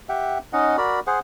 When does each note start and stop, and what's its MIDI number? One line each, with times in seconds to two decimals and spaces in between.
0.09 0.38 67
0.09 0.38 76
0.09 0.38 78
0.09 0.38 79
0.53 0.77 61
0.53 0.77 63
0.53 0.77 75
0.53 0.77 78
0.78 1.00 66
0.78 1.00 70
0.78 1.00 74
0.78 1.00 83
1.07 1.19 68
1.07 1.19 72
1.07 1.19 78